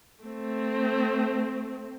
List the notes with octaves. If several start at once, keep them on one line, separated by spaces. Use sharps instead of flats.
A3 C4